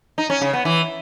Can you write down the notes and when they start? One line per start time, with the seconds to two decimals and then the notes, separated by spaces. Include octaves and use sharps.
0.18 D#4
0.30 C#4
0.42 C#3
0.53 B3
0.65 E3